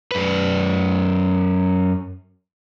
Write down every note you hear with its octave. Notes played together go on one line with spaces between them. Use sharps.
F#2 B4